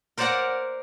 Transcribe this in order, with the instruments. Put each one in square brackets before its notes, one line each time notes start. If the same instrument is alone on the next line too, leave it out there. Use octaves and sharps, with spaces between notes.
[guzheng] A#4 C5 D5 F5 F#5 A#5